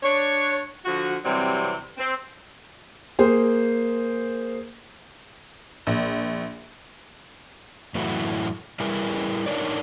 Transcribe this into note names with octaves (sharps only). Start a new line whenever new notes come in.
D4 C#5
D3 F3 F#4
C3 E3 F#3 G3 C4
C4
A#3 G#4 C5
A#1
F#2 A2 E3 A3 E4 F#4
G3 E4 G#4 A#4 B4
D4 D#4 A#4 C#5 D5